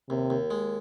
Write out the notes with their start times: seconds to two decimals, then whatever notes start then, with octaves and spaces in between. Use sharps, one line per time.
0.09 D#2 C3
0.30 D#2
0.51 G#3